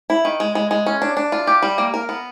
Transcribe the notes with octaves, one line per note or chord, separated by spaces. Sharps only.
E4
D#3
G#3
G#3
G#3
C#4
D4
D4
F4
G4
G3
A#3
A#4
B3